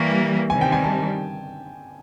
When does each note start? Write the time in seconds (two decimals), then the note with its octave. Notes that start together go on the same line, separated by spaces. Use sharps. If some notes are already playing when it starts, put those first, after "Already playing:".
Already playing: E3 G3 A#3 C#6
0.49 C3 D#3 G3 G#5
0.61 G5
0.72 G#5
0.84 A5